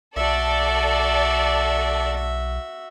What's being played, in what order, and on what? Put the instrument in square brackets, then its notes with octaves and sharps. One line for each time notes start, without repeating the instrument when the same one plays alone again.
[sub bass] B1 [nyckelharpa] F#4 E5 [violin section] A4 D5